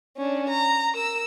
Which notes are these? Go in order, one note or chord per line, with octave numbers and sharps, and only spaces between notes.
C#4 D4
A#5
A#4 E6